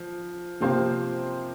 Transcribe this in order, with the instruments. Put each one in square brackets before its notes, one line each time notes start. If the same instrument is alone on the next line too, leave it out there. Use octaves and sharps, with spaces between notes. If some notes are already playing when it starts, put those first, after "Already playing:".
Already playing: [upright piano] F3
C3 F3 A#3 G4 C5